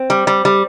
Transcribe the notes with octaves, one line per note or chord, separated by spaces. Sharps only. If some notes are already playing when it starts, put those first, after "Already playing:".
Already playing: C4
G3
G3
G3